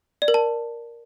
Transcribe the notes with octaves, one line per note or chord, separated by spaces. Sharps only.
D5
A#4
A5